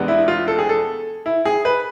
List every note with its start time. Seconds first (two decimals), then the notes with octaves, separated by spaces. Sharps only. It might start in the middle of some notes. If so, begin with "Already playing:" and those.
Already playing: E2 C3 G#3 B3 D4
0.08 E4
0.28 F4
0.48 A4
0.59 G#4
0.69 A4
1.26 E4
1.45 G#4
1.65 B4